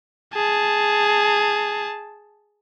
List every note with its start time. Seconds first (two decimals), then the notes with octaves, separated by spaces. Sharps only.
0.34 G#4 A5